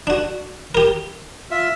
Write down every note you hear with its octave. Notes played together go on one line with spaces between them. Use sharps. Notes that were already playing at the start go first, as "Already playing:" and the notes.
D4 F#4
G4 A#4
F4 E5